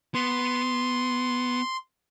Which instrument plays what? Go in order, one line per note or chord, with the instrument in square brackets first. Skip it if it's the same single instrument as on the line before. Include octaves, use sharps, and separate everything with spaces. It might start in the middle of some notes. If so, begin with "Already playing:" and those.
[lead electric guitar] B3 [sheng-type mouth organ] C6